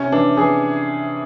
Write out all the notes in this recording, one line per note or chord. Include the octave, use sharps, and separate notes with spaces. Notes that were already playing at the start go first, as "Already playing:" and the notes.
Already playing: C3 C#4
E3 D4
E3 G#4